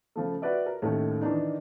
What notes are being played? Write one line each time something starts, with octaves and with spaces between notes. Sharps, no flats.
C#3 F3 A3
F#4 B4 D5 E5
A#4
D#2 A2 D#3 A3 C#4
D#3 E3 D4 D#4